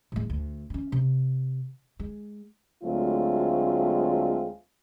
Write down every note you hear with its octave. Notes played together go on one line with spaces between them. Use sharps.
A2 G#3
D2
C4 C#4
C3
G#3
D2 F#3 G#3 A3 C4 F4